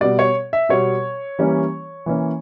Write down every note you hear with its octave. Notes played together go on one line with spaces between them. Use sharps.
B2 G3 B3 D5
C#5
E5
B2 G3 B3 C#5
E3 G3 A#3 C#4
E3 A#3 C#4